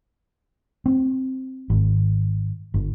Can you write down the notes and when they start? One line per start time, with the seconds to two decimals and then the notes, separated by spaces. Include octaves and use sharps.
0.86 C4
1.70 G#1
2.74 G1